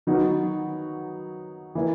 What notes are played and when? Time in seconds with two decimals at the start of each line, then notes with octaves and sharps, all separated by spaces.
0.07 D#3 F#3 B3 D#4 F#4
1.75 E3 A#3 E4